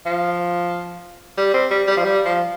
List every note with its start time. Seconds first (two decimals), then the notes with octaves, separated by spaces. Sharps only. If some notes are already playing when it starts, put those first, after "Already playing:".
0.06 F3
1.38 G3
1.54 C4
1.71 G3
1.87 G3
1.97 F3
2.04 G3
2.26 F3